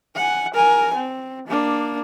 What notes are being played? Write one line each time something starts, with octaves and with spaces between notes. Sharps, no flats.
F#5 G#5
A#4 G#5
C4
A#3 D4